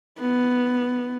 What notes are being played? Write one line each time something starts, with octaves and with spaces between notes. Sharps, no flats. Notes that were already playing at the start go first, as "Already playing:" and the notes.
B3